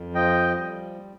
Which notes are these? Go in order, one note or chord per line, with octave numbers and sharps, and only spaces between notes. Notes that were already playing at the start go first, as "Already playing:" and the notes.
Already playing: F2
F3 D#5 G5
G3